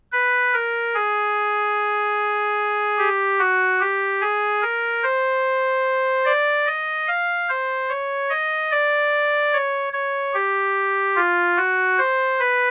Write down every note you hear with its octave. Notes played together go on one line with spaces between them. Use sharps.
B4
A#4
G#4
G4
F#4
G4
G#4
A#4
C5
D5
D#5
F5
C5
C#5
D#5
D5
C#5
C#5
G4
F4
F#4
C5
B4